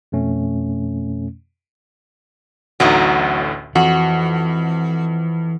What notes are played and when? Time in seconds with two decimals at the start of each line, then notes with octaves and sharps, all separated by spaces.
0.12 F2 B2 A3 C#4
2.80 A1 D2 A2 F#3 D#4
3.75 F2 E3 F#4